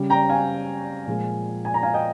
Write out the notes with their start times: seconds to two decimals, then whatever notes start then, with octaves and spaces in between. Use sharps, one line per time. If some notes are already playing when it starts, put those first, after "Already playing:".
Already playing: C#3 G3
0.10 G5 A#5
0.29 F5 G#5
1.07 A#2 F3 G#3
1.65 G#5
1.74 A#5
1.83 F5 G#5
1.94 D#5 G5